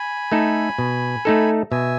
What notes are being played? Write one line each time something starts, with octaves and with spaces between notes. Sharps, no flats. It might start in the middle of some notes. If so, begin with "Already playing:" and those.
Already playing: G#5 B5
A3 D#4 A4
B2
A3 D#4 A4
B2 E5 G#5